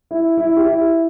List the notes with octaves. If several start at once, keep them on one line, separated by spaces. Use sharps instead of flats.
E4
E4
G4
E4